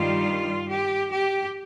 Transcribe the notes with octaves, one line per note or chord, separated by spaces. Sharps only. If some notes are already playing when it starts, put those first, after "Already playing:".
Already playing: G2 D#3 G3 F4
G4
G4